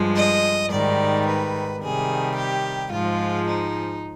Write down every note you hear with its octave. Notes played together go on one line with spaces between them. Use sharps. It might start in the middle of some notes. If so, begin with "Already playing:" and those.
Already playing: G2 F3 G#3
D#5
G#2 D#3 G3 D5
B4
C3 D#3 G3 G#4
G4
G#2 F3 G#3 F4
D#4